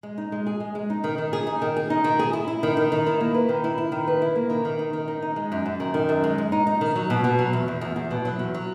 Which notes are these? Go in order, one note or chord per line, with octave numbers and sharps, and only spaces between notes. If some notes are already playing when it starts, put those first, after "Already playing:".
G#3
D#4
G#3
G#4
G#3
G#3
D#4
D#3
D#3
G#4
D#4
D#3
G#4
D#4
D#3
G#4
E4
E4
D#3
D#3
D#3
E4
A#3
B4
D#3
E4
E4
D#3
B4
E4
A#3
D#3
D#3
D#4
D#3
D#4
D#4
G#3
F#2
F#2
D#3
D#3
F#2
G#3
G#3
D#4
D#4
D#3
F#3
B2
B2
F#3
E2
E2
E2
E2
B2
F#3
E2
F#3